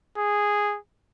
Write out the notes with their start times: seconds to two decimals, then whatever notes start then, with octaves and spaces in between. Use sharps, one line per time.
0.18 G#4